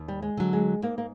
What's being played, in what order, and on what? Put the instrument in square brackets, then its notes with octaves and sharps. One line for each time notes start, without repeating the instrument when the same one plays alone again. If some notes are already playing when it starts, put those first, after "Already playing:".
Already playing: [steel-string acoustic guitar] D#2
[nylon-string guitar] G3
G#3
[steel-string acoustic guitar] D3 F#3
[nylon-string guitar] G#3
[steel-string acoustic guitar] G#2 [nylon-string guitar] A#3
[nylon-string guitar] A#3